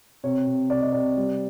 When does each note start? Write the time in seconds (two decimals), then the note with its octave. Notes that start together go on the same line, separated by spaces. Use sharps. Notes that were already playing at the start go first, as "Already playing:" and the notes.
0.24 C3 C#5
0.47 C3
0.70 C3 D5
0.81 D#5
0.92 C3 D5
1.17 G3